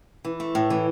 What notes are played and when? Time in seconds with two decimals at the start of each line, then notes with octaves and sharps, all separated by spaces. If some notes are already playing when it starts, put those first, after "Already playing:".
0.25 E3
0.40 A3
0.55 A2
0.70 E3